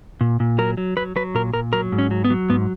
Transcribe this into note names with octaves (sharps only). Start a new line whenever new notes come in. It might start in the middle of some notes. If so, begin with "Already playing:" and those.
A#2
A#2
F#3 A#4
F#3
F#3 B4
F#3 B4
A#2 A#4
A#2 A#4
F#3 A#4
G#2
C#4
F#3
B3
F#3
G#2 B3